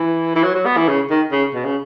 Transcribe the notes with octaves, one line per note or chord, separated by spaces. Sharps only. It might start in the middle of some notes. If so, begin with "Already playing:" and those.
Already playing: E3
E3
F#3
F#3
B3
E3
C#3
D#3
C#3
B2
C#3